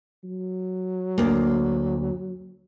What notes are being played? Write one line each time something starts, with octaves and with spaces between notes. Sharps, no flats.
F#3
D2 A#3